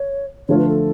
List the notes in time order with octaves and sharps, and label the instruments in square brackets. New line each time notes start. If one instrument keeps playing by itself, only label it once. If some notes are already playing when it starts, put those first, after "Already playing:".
Already playing: [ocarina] C#5
[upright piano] D3 F3 A3 F4 [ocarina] C#5
[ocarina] B4
A4